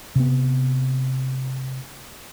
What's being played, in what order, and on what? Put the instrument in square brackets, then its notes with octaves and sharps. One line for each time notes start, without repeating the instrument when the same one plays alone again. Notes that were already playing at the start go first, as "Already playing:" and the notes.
[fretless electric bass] C3 B3